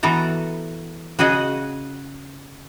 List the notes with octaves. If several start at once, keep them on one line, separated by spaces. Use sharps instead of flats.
E3 B3 F#4 A4 A#5
C#3 F#4 G#4 D#5 F#5